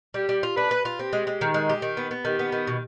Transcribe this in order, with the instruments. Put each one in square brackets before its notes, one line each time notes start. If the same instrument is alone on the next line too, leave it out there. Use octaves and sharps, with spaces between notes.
[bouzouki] G3 [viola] G4
[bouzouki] G3
F4
[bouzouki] D4 [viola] B4
[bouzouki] B4
F4
[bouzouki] C4 [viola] G4
[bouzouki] G#3
G#3
D#3
G#3
G4
D#3
B3
B3
[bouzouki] D#3 [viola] G4
[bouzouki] B3
D#3
B2